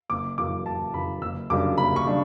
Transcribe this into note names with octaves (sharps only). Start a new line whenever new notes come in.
F#1 D6
F#2 C#3 E3 D6
F#1 A5
F#2 C#3 E3 B5
F#1 E6
F#2 C#3 G3 D4 D6
F#1 B5
C#6
C#3 G3 D4